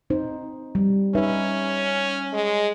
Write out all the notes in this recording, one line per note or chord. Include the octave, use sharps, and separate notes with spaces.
C4 D#4 C5
G3
C#4 D#4 B4 E5
G#3